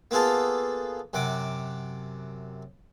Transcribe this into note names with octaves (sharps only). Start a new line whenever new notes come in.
A#3 B3 F4 G#4 A4
F#2 C3 F#5 D6